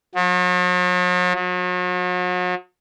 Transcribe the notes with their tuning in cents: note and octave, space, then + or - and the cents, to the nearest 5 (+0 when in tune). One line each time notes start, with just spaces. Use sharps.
F#3 -45
F#3 -40